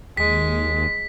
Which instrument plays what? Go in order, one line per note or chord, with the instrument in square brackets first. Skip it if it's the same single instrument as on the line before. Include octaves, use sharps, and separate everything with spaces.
[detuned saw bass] D#2 [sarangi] G#3 [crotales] B6